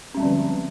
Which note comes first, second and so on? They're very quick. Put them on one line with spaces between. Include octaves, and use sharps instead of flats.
C#4 G3 C4 F3 D3